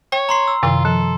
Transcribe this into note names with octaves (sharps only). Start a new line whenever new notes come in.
C#5 G5
A#5 C6 C7
E6
F#2 C3 D#3 F4
F3 A4